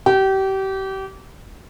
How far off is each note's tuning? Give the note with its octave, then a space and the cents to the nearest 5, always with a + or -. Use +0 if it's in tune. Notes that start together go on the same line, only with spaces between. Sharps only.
G4 -30